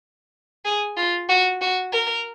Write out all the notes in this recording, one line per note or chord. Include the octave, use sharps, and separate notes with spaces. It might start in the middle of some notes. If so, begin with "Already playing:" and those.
G#4
F4
F#4
F#4
A#4